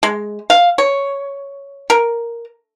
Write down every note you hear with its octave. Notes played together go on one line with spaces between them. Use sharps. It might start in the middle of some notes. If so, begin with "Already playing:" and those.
G#3
F5
C#5
A#4